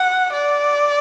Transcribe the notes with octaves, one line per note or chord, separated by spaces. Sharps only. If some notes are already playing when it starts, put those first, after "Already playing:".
Already playing: F#5
D5